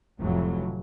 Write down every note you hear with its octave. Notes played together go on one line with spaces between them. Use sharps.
F1 F2 A2 E3 F#3